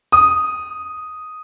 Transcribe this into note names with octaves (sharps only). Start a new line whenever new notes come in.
D#6